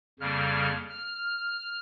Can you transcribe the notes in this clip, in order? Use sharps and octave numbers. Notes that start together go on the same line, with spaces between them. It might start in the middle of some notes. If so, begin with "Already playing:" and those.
F2 C#3 G3 A#3 F6
F6